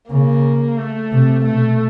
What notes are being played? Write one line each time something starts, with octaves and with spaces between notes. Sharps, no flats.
C#3 A#3
A3
C3
B2 A3